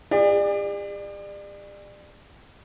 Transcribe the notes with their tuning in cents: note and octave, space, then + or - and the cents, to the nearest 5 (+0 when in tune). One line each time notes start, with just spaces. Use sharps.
G#4 -45 D5 +30